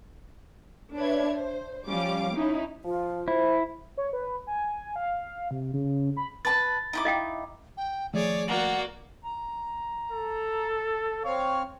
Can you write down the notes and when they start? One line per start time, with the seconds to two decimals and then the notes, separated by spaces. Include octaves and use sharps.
0.95 D4 B4 C#5 E5 G#6
1.35 C5
1.88 F3 G3 C#4 F5 D6
2.35 C#4 D#4 E4
2.84 F3 F4
3.28 E4 C5
3.97 C#5
4.13 B4
4.47 G#5
4.96 F5
5.51 C3
5.73 C#3
6.17 B5
6.45 B4 A5 A6
6.93 D#4 E4 D6
7.05 D#5 F5 G5
7.77 G5
8.14 D#3 F3 A3 G#4 C#5 D5 D6
8.48 A#3 F#4 D5 F#5
9.24 A#5
10.12 A4
11.25 C4 C#5 F5 C#6